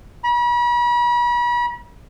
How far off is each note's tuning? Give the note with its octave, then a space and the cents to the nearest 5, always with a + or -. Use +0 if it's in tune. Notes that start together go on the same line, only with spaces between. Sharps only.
B5 -40